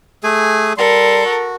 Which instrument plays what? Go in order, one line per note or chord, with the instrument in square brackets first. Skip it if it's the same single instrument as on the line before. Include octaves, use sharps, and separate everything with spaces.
[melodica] A3 G#4 G#5
[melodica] G3 C6 [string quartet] A4 A#4
[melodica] F#4